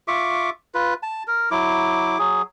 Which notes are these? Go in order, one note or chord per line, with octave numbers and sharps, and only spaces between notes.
F4 E5 C#6 D6
F4 B4
A5
A#4
F#3 E4 D6
F#3 G#4